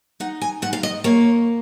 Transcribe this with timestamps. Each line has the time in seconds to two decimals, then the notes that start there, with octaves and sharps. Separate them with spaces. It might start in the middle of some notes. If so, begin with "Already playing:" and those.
0.20 D#4 F#5
0.41 G#5
0.62 G#2 F#5
0.73 F5
0.83 D#5
1.04 A#3 C#5